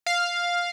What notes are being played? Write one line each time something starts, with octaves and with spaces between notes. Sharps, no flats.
F5